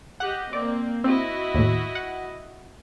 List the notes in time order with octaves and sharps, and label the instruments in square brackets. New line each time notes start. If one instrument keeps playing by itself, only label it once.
[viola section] G4 D#5 [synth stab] F#5 F#6
[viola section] A#3 C4 [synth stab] D5
[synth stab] C4 [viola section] E4 F#4 D#5
[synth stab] D#2 A2
F#5